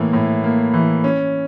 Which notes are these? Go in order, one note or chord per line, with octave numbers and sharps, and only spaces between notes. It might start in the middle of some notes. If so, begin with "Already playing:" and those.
Already playing: A2 E3 A#3
A2
A#3
E3
C#4